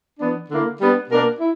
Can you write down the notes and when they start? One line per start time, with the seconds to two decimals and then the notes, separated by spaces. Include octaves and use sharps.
0.18 E3 B3 D4
0.50 D3 A#3 E4
0.80 G3 B3 D4
1.10 B2 A#3 D4 A#4
1.40 E4